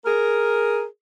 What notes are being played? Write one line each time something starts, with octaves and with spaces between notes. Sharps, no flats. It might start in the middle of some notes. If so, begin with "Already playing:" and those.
G#4 A#4